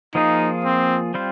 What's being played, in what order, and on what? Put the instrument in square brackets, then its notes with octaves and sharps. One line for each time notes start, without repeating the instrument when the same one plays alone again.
[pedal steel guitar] F3 A#3 F4 G#4 [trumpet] D#4
[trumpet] C4
[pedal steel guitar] G3 C4 F4 C5